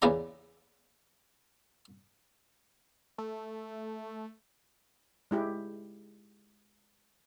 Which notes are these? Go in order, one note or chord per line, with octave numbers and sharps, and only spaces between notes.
E2 C#3 B3 G#4 D5 A#5
A3
G#3 E4 G4